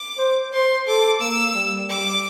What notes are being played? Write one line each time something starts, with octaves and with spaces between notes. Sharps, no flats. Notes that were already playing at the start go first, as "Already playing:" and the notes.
Already playing: D6
C5
C5 C6
A4 D6
A#3 E6
G3
G3 D6